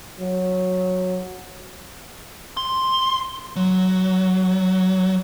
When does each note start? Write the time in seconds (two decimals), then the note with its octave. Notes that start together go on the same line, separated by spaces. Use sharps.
0.19 F#3
2.57 C6
3.56 F#3